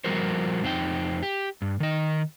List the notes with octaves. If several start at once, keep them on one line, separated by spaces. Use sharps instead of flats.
F3 G3 F#4 A#4 C5
F2 C#3 C4 D4 D#4 G5
G4
G2
D#3 D#5